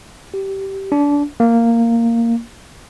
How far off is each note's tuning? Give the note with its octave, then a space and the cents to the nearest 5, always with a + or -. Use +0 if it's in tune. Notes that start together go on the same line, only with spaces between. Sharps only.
G4 -15
D4 -25
A#3 -10